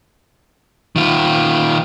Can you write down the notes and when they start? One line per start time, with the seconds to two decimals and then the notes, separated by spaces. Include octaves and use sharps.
0.96 D#3 F4